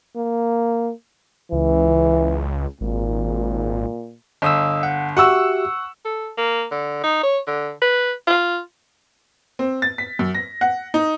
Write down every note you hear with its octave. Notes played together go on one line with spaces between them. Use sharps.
A#3
C#2 E3
G#1 A#2
G1 D#5 D#6 E6
F#5
F#4 G4 E5 F#5 C#6 E6
A4
A#3
D3
D#4
C#5
D3
B4
F4
C4
A6
B6
F#2
A#6
F#5
D#4